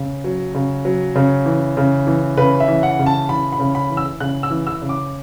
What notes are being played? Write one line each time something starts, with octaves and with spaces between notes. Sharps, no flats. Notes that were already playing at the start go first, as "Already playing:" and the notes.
Already playing: C#3
F#3
C#3
F#3
C#3
E3
C#3
E3
C#3 B4
E5
E3
F#5
C#3
A5
E3 B5
B5
C#3
B5
E3
E6
C#3 F#6
E6
E3
E6
C#3
D6